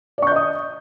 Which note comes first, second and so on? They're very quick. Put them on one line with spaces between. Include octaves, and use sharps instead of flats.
D5 C#6 G6 D#5 D#6